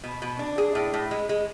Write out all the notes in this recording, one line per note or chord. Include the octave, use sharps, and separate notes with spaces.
B2
B2
D4
G#4
A2
A2
G#3
G#3